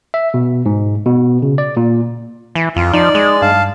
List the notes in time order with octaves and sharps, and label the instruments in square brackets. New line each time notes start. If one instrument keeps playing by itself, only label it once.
[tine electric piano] E5
B2
G#2
B2
C#3
D5
A#2
[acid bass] E3
[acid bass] F2 [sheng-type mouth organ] F4
[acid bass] F3 [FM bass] D#4 [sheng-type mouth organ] D5
[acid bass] G#3
[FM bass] G2 [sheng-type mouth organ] F5 A5